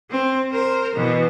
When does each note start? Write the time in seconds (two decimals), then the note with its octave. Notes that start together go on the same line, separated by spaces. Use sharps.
0.11 C4
0.52 A#4 C5
0.95 B2 E3